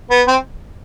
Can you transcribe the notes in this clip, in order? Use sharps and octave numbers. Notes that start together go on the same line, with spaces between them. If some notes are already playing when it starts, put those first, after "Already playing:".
B3
C4